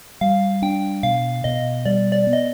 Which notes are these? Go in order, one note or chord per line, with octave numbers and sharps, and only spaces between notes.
G3 F5
D4 G5
B2 F5
B2 D#5
G3 D5
D5
B3
D#5